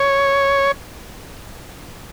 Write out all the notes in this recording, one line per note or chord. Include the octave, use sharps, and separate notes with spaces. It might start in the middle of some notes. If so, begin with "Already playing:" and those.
Already playing: C#5